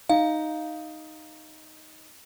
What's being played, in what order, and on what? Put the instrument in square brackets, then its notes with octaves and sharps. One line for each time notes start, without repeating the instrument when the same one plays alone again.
[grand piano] D#4 [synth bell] F5